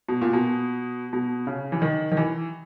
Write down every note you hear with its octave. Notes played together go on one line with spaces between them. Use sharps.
B2
A#2
B2
B2
C#3
E3
D#3
D#3
E3